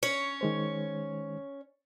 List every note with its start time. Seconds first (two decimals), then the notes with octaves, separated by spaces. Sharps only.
0.03 C#4 C#5
0.41 D#3 G#3 C5